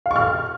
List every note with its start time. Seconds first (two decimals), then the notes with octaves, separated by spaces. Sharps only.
0.06 F5
0.11 C#6
0.16 F6